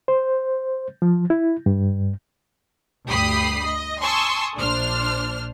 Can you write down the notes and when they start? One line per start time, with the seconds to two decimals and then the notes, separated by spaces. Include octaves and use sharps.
0.08 C5
1.02 F3
1.30 E4
1.66 G2
3.08 D2 G2 G4 B5 D#6 C7
3.67 D#5
4.01 G#5 A5 C6 C#6 D#6 E6
4.57 A#1 D4 C5 F6